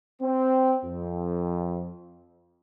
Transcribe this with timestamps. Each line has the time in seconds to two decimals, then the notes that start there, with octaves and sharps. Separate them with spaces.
0.22 C4
0.85 F2